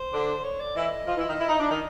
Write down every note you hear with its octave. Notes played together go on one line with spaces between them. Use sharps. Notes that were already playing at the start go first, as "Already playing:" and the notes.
Already playing: C5
D3 D4
C#5
D5
E3 E4 D#5
F3 F4
E3 E4
D#3 D#4
E4
D#4
D4
D#3 D#4